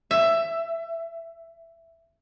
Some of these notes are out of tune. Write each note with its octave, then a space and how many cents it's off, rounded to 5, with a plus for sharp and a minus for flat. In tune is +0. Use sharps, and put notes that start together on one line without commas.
E5 +15